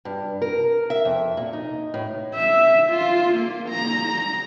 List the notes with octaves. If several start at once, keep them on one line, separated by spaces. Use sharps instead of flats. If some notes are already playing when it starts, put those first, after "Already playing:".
G2
A#4
E5
F2
A#2
D#4
A2
E5
F4
A#3
A#5